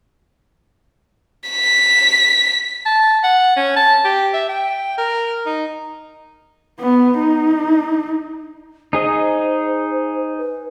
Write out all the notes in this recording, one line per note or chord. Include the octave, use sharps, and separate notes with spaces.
B6
A5
F#5
C#4
A5
G4
E5
G5
A#4
D#4
B3
D#4
D#4 G#4 C5 D#5
B4